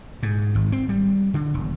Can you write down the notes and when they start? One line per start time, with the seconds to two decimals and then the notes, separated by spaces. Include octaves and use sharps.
0.23 G#2
0.55 G#1
0.72 C4
0.89 G3
1.34 D3
1.54 E1